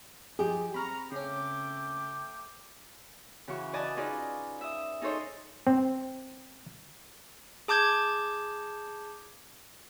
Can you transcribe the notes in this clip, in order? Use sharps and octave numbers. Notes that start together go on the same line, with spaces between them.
F3 G4 G#4
C4 A#5 B5 C#6 F6
C#3 A3 C#4 G5 D6
C#3 E3 F#4 C#6
B4 D5 D#5 G#5 A5
C#4 D#4 F4 G#4 B4 D5
E5 D#6
D#4 G#4 A4 C5 C#5 D#5
C4
G#4 A5 D6 G6 G#6